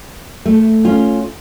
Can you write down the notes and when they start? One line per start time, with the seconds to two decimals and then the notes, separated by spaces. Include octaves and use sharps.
0.46 A3
0.85 C#4 F4